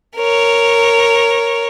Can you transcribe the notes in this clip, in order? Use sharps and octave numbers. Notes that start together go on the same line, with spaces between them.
A#4 C#5